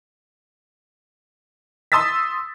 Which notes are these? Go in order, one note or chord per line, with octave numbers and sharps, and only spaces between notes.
C6 D#6 E6 A6 B6